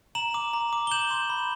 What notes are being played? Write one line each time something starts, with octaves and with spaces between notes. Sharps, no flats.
A#5 E7 F#7
D6
A#5
D6
G7
G6 E7 F#7
C6
B5